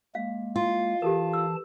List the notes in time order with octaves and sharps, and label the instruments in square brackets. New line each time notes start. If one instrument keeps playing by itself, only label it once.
[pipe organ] G#3 A#3 [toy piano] F5
[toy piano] E4 [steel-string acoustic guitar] F4
[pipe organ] E3 A5 [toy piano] G4 A4 A#4
[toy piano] E6